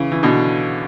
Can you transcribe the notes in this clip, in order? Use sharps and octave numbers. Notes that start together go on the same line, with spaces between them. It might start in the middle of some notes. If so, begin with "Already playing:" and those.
Already playing: C#3 E3
E3
B2 D3